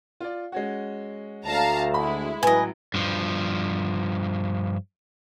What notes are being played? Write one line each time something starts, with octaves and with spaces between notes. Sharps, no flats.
F4 D5
G#3 C#4 F#4
D2 F5 A5 A#5
G#3 E4 B5
A1 E3 F#3 B4 D#5 G#5
G2 F3